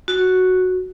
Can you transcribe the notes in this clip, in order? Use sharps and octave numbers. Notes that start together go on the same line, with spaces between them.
F#4